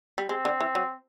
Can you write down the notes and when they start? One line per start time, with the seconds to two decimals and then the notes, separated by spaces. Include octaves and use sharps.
0.18 G3
0.29 G#3 C4
0.45 D3
0.60 E3
0.75 F#3